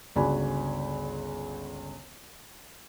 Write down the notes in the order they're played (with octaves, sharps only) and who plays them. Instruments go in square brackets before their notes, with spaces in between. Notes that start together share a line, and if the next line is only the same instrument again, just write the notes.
[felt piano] G1 C#2 F#4 D5 G#5 B5